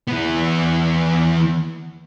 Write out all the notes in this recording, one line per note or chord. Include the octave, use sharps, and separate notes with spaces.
E3 B3